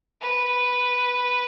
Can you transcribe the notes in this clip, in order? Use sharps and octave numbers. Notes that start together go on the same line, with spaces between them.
B4